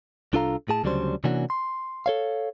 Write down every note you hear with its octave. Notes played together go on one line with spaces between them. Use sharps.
C2 D4 F4 A4 F5 A#5
A2 G#4 A5
D2 C#3 F#3 G3 D4 C5
C3 E3 A#3 C#4 D4 F#4
C6
A4 C#5 F5